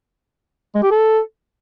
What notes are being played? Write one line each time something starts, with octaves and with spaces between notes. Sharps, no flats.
G#3
G4
A4